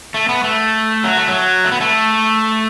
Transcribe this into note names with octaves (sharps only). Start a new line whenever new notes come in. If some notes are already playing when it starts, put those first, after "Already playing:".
A3
B3
A3
F#3
A3
F#3
A3
B3
A3